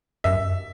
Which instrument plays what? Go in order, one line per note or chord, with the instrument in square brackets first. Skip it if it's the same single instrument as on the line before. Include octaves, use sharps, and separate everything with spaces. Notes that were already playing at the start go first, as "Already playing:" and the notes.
[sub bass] F#2 [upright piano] E5